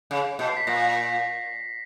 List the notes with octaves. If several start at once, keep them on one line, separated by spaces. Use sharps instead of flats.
C#3
B2
C7
B6
A#2 A#6